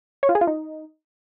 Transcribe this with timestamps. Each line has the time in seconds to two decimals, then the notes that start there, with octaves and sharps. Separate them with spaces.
0.23 C#5
0.29 F4
0.35 G#4
0.41 F4
0.47 D#4